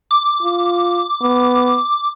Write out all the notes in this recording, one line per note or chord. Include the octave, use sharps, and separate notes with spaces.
D6
F4
B3